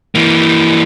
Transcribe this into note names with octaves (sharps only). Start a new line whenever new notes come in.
E3 A#3